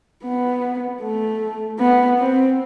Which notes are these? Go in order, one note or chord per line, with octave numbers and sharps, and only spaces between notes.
B3
A3
B3
C4